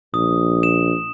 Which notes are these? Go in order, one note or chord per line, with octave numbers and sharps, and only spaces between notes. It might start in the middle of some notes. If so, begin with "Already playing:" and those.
A#1 D#6
E7